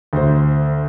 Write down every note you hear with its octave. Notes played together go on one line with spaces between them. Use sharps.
D2 C5